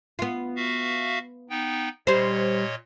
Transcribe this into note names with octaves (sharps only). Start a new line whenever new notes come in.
B3 F4
F#4 E5 F5
B3 D#4 G5
A#2 G3 C5 C#5 D#5